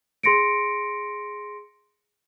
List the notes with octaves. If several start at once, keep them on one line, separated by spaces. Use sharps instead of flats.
G#4 C6 A#6 C#7 D7